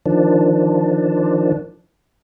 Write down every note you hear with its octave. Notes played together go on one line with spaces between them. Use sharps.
D#3 F3 D4